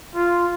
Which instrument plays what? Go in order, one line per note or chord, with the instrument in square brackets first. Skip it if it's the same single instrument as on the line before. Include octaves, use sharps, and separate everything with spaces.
[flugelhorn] F4